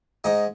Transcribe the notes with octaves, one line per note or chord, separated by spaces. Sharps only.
G#2 D#4